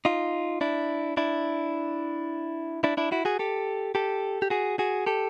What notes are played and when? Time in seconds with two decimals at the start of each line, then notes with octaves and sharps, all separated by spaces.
0.05 D#4 F4
0.61 D4 E4
1.17 D4 E4
2.84 D4 E4
2.97 D4 E4
3.12 E4 F#4
3.25 F#4 G#4
3.39 G4 A4
3.95 G4 A4
4.42 G4
4.50 F#4 G#4
4.79 F#4 G#4
5.06 G4 A4